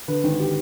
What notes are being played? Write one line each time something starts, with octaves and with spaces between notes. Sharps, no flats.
D3 B4
G#1
G4